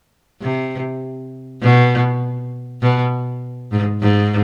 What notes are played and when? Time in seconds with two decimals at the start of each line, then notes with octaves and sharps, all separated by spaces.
0.42 C3
1.62 B2
2.82 B2
3.72 G#2
4.01 G#2